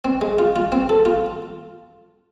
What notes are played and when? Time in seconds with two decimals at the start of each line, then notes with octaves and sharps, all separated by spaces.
0.05 C4
0.21 G#3
0.39 F4
0.56 F4
0.72 C4
0.89 A4
1.05 F4